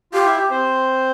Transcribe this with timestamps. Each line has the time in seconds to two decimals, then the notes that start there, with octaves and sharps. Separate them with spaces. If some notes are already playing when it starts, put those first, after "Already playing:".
0.13 F4 G4 F5
0.26 E4 E5
0.51 C4 C5